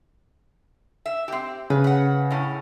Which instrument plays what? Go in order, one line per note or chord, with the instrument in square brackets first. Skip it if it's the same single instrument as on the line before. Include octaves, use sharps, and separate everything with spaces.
[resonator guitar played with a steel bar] E5
C4 G4
[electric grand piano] C#3 [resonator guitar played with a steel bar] B4
[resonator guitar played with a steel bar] B4 F#5
A2 C#4